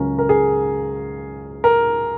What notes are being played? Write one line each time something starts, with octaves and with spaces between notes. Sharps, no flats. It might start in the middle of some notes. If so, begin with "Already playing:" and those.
Already playing: C#2 C#3 F#3 C#4 A#4
A#4
G#4
A#4